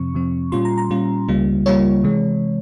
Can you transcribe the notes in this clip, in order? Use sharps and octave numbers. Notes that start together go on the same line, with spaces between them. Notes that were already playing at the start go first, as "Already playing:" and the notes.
Already playing: F2 C3 F3 C4 C#6
F2 C3 F3 C4
A#2 G3 C#4 F4 C6
A#5
A#5
A#2 G3 C#4 F4
C#2 C#3 G3 A#3 F4
C#2 C#3 G3 A#3 F4 C#5
C3 E3 G#3